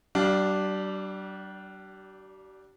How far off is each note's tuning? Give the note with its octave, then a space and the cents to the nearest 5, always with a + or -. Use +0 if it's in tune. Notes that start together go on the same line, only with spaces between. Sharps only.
G3 -40 D4 +0 F5 +0